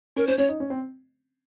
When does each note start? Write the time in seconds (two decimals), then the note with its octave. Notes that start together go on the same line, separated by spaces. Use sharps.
0.16 C#4 A#4
0.27 C#4 C5
0.38 C#4 C#5
0.49 D#4
0.60 C#4
0.70 C4